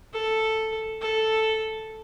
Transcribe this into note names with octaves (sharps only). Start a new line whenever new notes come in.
A4
A4